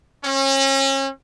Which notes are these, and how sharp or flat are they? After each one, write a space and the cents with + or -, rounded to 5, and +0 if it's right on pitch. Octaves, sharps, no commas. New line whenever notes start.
C#4 -35